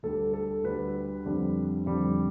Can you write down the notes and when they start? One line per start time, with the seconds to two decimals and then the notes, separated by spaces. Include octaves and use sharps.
0.03 D2 D3 G3 A4
0.34 A4
0.64 D2 D3 G3 B4
1.25 F2 D3 G3
1.86 F2 D3 G3